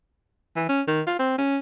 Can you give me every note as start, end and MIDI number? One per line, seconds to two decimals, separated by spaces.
0.56 0.69 52
0.69 0.82 61
0.88 1.02 51
1.07 1.16 65
1.19 1.37 60
1.38 1.58 61